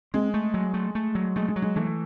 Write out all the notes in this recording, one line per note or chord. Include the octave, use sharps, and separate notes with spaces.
G#3 C4
A3
F#3
A3
A3
F#3
G#3 A3
G#3
F#3
G#3
E3 A3